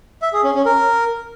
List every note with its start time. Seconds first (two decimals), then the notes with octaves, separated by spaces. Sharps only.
0.22 E5
0.33 G#4
0.44 C#4
0.55 C#4
0.66 A#4